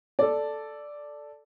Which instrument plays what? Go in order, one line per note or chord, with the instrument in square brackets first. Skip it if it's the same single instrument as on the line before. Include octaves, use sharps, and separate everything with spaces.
[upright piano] A4 D5